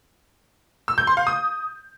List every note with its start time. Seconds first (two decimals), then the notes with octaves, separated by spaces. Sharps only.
0.88 E6
0.98 G6
1.07 C6
1.17 F5
1.27 D#6